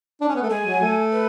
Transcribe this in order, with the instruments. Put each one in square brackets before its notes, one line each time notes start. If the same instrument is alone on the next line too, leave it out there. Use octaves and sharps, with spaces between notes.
[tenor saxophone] D4
C#4
B3
A3
[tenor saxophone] G#3 [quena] G#5
[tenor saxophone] F#3
A3
[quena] B4